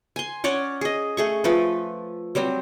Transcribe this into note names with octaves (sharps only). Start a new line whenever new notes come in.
G#5 C6
C#4 C#5 D5 F#5
G#4 D#5
A3 G#4 C#6
F3 A3 A4 B4
F#3 G3 C4